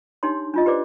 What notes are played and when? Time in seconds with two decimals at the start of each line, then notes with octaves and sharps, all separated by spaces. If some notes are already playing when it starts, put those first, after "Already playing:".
0.23 D4 D#4 G4 C#5 C6
0.54 D4 F4 D#5
0.66 G4 B4 C5 D5 D6